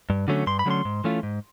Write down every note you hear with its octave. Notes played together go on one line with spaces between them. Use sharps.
G2
D3 F#3 A3 C#4
G2 C6
B5
D3 F#3 A3 C#4 C6
G#2
E3 A3 C#4 F4
G#2